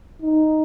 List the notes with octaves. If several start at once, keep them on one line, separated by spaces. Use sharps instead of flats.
D#4